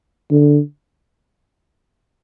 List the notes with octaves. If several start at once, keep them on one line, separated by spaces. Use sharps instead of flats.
D3